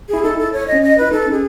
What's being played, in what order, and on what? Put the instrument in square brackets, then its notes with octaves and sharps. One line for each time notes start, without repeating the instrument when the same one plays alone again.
[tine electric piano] E4 [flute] G#4
[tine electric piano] D#4 [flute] A4
[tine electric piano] E4
[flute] A4
C#5
[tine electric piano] C#4 [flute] D#5
[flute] D#5
[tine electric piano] E4 [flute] B4
[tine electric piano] D#4 [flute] A4
[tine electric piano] C#4 [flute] G#4